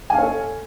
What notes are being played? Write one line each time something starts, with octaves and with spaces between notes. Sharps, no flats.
A4 C#5 F5 G#5